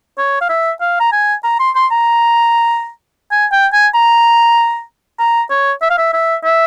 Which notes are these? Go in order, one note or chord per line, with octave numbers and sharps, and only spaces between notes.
C#5
F5
E5
F5
A#5
G#5
A#5
C6
C6
A#5
G#5
G5
G#5
A#5
A#5
C#5
E5
F5
E5
E5
E5